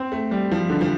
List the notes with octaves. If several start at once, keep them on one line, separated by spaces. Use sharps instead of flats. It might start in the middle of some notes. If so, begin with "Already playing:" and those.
Already playing: C4
A3
G3
F3
D3
F3